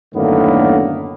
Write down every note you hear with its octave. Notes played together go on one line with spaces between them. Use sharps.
F#2 A2 D3 D#3 A#3 B3